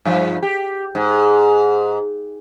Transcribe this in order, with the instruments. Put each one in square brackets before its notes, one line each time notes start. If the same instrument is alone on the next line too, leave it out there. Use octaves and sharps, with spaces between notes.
[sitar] G2 F3
G4
G#2